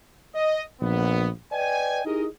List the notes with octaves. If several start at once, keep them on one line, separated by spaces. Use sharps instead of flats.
D#5
A#1 B3
B4 D5 D#5 G5 G#5
D#4 E4 G4 G#4 A#4 D#5